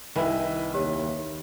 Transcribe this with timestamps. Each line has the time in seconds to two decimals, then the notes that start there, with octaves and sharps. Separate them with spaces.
0.16 C2 D#3 E4 B4 G#5
0.74 D#2 G4 C#5